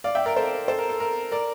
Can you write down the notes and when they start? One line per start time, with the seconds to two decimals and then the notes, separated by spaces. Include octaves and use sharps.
0.04 D5 F5
0.15 E5 G5
0.26 A#4 D5
0.36 A4 C5
0.68 A4 C5
0.78 A#4
0.89 A4
1.00 A#4
1.32 A#4 D5